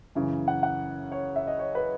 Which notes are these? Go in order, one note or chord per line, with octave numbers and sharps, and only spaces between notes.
F#2 C#3 E3
F#5
F#5
C#5
E5
D#5
C#5
B4